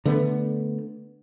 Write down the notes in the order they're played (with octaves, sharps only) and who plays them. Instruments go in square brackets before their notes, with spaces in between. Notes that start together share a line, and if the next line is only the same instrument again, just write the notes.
[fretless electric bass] D3 A3 B3